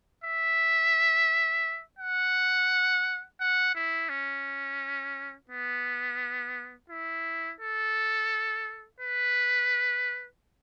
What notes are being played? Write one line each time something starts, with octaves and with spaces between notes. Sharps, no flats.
E5
F#5
F#5
E4
C#4
B3
E4
A4
B4